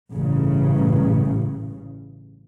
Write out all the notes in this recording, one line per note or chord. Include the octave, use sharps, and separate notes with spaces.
A1 G2 C#3